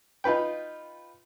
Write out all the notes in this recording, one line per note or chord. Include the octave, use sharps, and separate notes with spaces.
D#4 F4 B4 G5